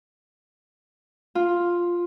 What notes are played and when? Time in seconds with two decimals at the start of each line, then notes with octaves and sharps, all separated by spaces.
1.35 F4